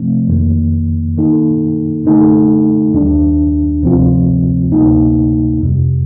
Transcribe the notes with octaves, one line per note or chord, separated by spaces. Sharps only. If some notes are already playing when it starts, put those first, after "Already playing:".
Already playing: C3 F3 A3 C4
F2 D#3 A#3
D#3 A#3 D#4 A4
D3 A3 D#4 A4
D#2 D#3 G3 D4
D2 C3 F3 C4 F4
D2 C3 G3 A#3 D#4
F2 C3 G3